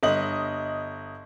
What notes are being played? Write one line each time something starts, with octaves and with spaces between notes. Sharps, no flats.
G1 D#5 F#7